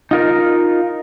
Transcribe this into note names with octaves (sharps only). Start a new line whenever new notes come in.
D#4 F4 A#4